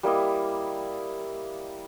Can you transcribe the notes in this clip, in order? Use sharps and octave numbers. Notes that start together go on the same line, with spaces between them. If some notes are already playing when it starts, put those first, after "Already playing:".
G3 A#3 E4 D#5